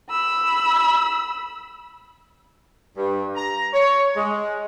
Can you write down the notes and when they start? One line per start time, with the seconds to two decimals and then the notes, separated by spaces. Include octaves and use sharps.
0.10 B5 E6
2.97 G2
3.35 A#5
3.73 C#5
4.16 G#3